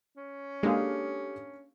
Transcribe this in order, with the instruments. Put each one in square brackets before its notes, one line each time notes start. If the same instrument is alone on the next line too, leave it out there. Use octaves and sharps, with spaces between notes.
[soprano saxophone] C#4
[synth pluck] G#3 [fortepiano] A#3 D4 F5 [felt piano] G4 A4 D#6